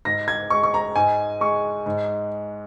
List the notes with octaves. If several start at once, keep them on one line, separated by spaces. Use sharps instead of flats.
G#2 A#6
G#6
G#3 C#6
C#6
A#5
G#2 G#5
G#3 C#6
G#2